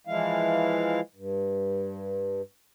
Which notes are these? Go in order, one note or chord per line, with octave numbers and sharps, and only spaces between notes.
E3 F3 G#3 E4 F5
G2